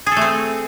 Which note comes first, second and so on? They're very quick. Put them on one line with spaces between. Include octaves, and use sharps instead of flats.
G#4 A4 A3 C4